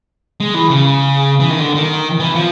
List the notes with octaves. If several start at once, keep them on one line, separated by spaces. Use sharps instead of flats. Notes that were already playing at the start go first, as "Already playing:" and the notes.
G#3
E3
C#3
E3
D#3
D3
D#3
E3
F3